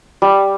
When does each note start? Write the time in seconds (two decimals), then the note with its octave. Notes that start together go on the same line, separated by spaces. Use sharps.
0.22 G3